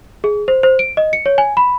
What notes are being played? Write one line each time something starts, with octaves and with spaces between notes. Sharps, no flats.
G#4
C5
C5
D7
D#5
C#7
C#5
G#5
B5